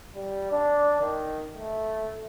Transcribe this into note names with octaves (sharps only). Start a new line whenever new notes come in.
G3
D4
D#3
A3